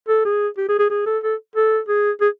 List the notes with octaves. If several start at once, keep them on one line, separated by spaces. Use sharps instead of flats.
A4
G#4
G4
G#4
G#4
G#4
A4
A4
A4
G#4
G#4